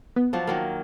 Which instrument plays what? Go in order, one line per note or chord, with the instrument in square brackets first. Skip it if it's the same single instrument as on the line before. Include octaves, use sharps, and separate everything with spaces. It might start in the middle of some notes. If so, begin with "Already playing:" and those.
[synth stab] B3
[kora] F3 F#3 D4
D#3 F#3 A#3